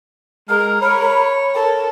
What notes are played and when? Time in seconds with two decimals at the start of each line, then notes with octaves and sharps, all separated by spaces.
0.49 G#3 A#4 F6
0.82 C#5 B5
1.55 A4 A#4